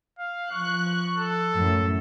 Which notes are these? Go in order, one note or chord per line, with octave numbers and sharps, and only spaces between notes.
F5
F3 C#6 F#6
A4
F#2 A2